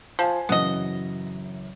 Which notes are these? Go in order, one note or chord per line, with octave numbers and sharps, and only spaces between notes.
F3 C5 G#5
F#2 C#3 E3 B3 D#5